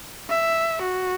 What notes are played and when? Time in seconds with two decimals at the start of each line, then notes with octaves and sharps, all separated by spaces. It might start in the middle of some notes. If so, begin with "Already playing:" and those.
0.30 E5
0.82 F#4